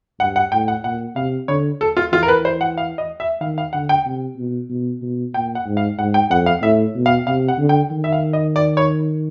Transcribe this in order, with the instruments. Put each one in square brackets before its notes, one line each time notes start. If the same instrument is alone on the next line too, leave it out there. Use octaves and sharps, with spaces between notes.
[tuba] G2 [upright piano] F#5
[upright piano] F#5
[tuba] A2 [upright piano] G5
[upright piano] F#5
[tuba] A#2 [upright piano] F#5
[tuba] C3 [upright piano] F5
[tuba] D3 [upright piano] C#5
[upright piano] A4
F4
[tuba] E3 [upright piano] F4
[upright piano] A#4
B4
C5
F#5
F5
D#5
E5
[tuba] D#3 [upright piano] F5
[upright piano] F5
[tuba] D3 [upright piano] F#5
[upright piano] G5
[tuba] C3
B2
B2
B2
[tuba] A#2 [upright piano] G5
[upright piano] F#5
[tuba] G#2
[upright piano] F5
[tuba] G#2 [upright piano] F#5
[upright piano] G5
[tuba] F2 [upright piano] F#5
[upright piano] F5
[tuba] A2 [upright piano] E5
[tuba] B2
[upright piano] F5
[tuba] C3 [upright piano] F5
[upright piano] F#5
[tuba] D3
[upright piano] G5
[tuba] D#3
[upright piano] E5
F5
D#5
D5
C#5